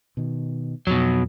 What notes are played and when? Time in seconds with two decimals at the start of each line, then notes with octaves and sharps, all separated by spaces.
0.17 B2 D#3
0.87 F2 B2 F#3